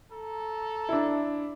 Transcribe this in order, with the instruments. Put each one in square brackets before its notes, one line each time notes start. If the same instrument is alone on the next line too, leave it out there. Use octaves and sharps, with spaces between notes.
[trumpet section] A4 A#5
[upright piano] D4 E4